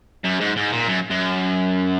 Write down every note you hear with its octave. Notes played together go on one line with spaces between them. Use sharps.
F#2
G#2
G#2
A#2
F#2
F#2